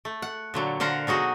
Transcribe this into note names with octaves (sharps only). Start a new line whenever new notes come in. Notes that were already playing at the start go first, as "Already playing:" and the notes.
A3
F#5
A#2 D3 F#3
D3 C5 F5 F#5 A#5
B2 F#3 D#4 F#4 G#4